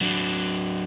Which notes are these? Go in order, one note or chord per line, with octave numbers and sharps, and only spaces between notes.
F#3 D4